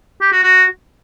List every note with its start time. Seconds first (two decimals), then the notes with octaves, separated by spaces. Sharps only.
0.21 G4
0.32 F#4
0.43 F#4